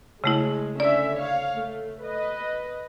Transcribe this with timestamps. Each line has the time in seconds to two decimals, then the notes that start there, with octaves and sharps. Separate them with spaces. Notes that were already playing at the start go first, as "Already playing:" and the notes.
0.24 C#3 G#3 A3 E4
0.80 D3 C#4 D5 E5
1.17 C#5 F5
1.54 A3
2.02 B4 D#5